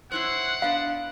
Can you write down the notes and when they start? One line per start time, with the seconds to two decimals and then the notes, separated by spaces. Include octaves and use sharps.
0.12 C#4 E4 C5 F#5 F#6 C7
0.62 B3 D4 F5